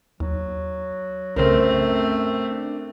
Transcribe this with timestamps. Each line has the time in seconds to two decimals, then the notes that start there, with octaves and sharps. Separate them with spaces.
0.20 D#2 F#3
1.36 C2 F#2 C#3 A3 C4 A#4 C5
2.50 D4